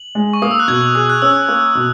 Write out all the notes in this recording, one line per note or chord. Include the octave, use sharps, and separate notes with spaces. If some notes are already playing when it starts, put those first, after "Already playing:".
Already playing: F#7
G#3
C#6
A#3 D#6
E6
F#6
B2 G#6
G#4 F#6
F#6
C#4 E6
A#3
B2